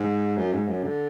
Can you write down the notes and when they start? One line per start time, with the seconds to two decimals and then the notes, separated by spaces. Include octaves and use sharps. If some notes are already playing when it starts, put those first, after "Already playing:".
Already playing: G#2
0.37 F#2
0.53 G#2
0.68 F#2
0.84 D3